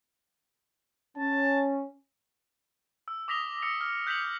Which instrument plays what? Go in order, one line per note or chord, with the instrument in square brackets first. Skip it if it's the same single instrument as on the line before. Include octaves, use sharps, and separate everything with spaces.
[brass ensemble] C#4 [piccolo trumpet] A5
[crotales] E6
D6 D#6 A#6 B6 F7 G7
E6 A#6 C#7 F7
F6
F#6 G6 B6 C#7 F7 F#7